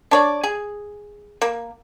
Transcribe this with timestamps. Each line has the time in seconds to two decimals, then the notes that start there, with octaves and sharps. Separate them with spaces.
0.11 D4 C#5 D5
0.44 G#4
1.42 A#3